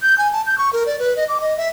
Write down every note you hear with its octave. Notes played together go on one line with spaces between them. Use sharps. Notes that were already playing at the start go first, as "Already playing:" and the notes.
G6
G#5
A5
G6
C#6
A#4
D5
B4
D#5
D6
D#5
E5